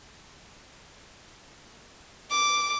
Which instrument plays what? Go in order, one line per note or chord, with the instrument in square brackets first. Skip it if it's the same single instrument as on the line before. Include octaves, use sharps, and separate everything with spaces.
[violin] D6